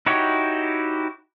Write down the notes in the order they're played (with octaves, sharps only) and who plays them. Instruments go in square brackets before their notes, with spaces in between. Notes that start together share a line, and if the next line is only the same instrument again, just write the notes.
[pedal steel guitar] D#4 E4 F#4 G4 C#5